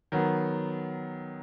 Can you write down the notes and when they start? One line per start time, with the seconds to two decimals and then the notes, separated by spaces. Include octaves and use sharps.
0.12 D#3 F#3 B3